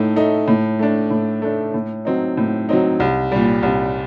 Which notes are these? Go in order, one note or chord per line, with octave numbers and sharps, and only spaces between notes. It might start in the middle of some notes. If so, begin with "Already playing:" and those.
Already playing: A2 A3 D#4
A3 D#4
A2
A3 D4
A2
A3 D4
A2
F#3 C4 D#4
A2
F#3 C4 D#4
C2
A#2 G3
C2